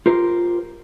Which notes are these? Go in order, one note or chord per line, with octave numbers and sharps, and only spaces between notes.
F4 G4 A#4 C5